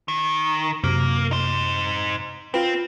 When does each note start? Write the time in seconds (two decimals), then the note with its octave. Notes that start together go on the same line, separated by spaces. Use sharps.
0.08 D#3
0.84 F#2 C3 A#3
1.31 D#4 C5
2.54 C4 F4 B4